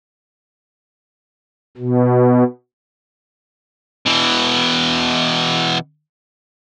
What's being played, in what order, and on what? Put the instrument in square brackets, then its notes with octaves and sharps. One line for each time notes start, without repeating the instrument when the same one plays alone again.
[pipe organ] B2
[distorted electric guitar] B2 E3